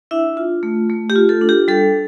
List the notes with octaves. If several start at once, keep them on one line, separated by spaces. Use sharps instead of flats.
D4 E4 E5
F4
A3
A3
G4
F4
A4
D4
G4
G3 A4